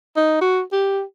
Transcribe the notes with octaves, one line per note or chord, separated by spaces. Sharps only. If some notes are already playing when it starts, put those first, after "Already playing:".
D#4
F#4
G4